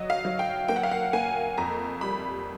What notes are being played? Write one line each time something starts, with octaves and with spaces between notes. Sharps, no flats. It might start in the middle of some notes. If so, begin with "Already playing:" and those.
Already playing: F#3 D#5
F5
F#3
G5
A#3 G5
F#5
F5
F#5
A#3 G#5
F2 A#5
G3 B5